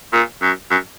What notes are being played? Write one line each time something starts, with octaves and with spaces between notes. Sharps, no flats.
A#2
F#2
F#2